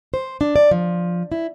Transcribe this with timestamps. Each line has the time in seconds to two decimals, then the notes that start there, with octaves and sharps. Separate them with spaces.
0.14 C5
0.41 D4
0.56 D5
0.71 F3
1.32 E4